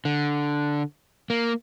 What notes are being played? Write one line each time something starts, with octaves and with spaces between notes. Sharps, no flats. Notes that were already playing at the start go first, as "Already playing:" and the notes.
D3
A#3